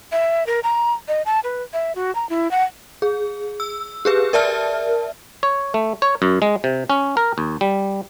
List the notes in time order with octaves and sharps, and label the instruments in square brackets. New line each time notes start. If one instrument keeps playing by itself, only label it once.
[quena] E5
A#4
A#5
D#5
A5
B4
E5
F#4
A#5
E4
F#5
[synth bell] G#4
E6
G4 G#4 B4
A#4 D5 E5 A5 F6
[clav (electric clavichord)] C#5
A3
C#5
F#2
G#3
C3
C#4
A#4
D#2
G3